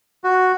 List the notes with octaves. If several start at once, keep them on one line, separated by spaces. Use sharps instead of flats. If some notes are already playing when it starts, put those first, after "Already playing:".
F#4